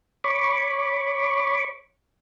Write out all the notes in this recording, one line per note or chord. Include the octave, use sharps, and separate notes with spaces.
C#5 B5 C#6 D6